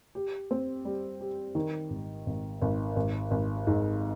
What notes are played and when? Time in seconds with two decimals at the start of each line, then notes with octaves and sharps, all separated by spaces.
0.15 G4
0.51 C4
0.85 G3
1.21 G4
1.55 D#3
1.90 G#1
2.26 G#1
2.62 G#1
2.96 G#1
3.31 G#1
3.67 G#2